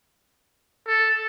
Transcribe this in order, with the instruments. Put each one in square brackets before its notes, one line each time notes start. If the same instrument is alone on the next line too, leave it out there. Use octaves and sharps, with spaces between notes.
[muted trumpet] A4